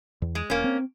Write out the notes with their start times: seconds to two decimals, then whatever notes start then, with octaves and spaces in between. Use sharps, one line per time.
0.22 E2
0.35 G#3
0.50 E1 A#3 C#4
0.64 C4